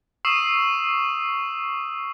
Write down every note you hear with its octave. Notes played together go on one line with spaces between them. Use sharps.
C#6 D#6 E6 C7 E7